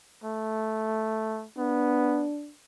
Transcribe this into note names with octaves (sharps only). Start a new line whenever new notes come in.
A3
B3 D4